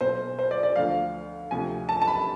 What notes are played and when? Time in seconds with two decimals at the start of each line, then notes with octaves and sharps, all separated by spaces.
0.01 B1 B2 C5
0.39 C5
0.51 D5
0.63 D5
0.76 D2 D3 F3 F5
1.51 D2 C3 F3 G#5
1.89 A5
2.02 A5
2.07 B5